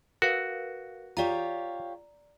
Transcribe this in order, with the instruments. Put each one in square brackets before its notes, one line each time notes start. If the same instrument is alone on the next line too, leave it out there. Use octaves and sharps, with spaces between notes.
[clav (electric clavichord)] F#4 [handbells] A#4 B4 F5
[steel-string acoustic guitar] F4 G4 C#5 [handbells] D5 A#5